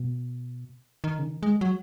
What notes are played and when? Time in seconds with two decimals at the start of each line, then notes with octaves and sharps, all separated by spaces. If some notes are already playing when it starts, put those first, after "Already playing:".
Already playing: B2
1.04 D#3
1.19 C#3
1.24 D#3
1.43 G#3
1.61 F#3